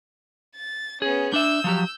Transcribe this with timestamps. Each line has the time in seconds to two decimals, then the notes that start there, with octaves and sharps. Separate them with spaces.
0.56 A6
1.02 B3 C#4 G#4
1.34 D4 E5 E6 G6
1.64 F3 F#3 G4